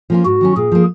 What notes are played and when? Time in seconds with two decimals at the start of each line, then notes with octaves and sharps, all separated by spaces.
0.10 F3 A#3 C#4 F4
0.25 G#2 F#4
0.41 D#3 F#3 C#4
0.56 A#2 G#4
0.72 F3 A#3